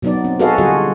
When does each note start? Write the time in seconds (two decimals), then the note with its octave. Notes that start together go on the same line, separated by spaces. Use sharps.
0.02 B2 F#3 B3 D#4 D5
0.25 C4
0.39 F#4 G#4 A4 B4 D#5 F5
0.58 D3 G3 F4 F#4 G#4 D#5